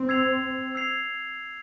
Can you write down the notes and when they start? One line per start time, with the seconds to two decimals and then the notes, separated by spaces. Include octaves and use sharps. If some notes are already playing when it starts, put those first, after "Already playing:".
Already playing: C4
0.09 E6 G#6 C7 F7
0.75 E6 G#6 C7 F7